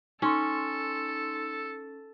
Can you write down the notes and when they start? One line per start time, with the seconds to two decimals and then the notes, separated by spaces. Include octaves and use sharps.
0.22 C#4 D#4 A4 C6